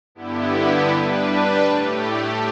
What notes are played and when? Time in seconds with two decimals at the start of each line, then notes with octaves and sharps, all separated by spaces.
0.15 G2 D3 B3 E4 G4
0.89 G3 D4 B4
1.65 A2 A3 G4